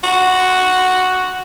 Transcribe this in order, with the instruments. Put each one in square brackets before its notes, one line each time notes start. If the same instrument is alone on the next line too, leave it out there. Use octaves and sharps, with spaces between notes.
[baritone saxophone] F#4